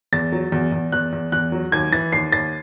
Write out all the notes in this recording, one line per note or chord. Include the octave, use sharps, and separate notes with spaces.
E2 A6
F#3
E2
E2
E2 F#6
E2
E2 F#6
F#3
D#2 G#6
E3 A6
D#2 C7
D#2 A6